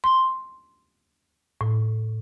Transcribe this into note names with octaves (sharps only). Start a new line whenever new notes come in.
C6
A2